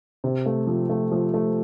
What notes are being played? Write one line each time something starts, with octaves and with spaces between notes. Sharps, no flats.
C3
A3
F3
A3
F3
A3